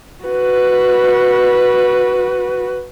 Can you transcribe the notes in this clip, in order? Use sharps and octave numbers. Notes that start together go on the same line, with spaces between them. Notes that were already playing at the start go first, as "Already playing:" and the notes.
F#4 B4